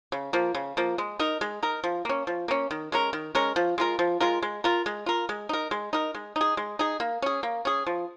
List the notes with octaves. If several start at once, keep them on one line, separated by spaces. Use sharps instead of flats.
C#3
F3 A#3
C#3
F3 A#3
G#3
D#4 A#4
G#3
D#4 A#4
F3
A#3 C#4
F3
A#3 C#4
D#3
G#3 C#4 A#4
D#3
G#3 C#4 A#4
F3
G#3 F4 A#4
F3
G#3 F4 A#4
G#3
F4 A#4
G#3
F4 A#4
G#3
D#4 A#4
G#3
D#4 A#4
G#3
D#4 G#4
G#3
D#4 G#4
A#3
C#4 G#4
A#3
C#4 G#4
F3